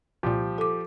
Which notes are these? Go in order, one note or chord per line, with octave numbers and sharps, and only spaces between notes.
C2 A#2 F3 G4
A4 D6